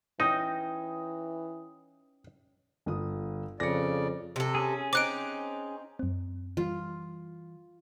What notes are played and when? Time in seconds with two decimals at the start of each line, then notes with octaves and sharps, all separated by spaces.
0.20 E3 C#4 D#4 G5 D#6 A#6
2.86 G1 F4 D#6
3.60 F2 C#3 D5 A#6 C#7
4.36 C3 A4
4.55 C#4 G#4
4.93 C4 D#4 D6 F#6 D7
5.99 F#2 C4
6.57 E3 G3 F4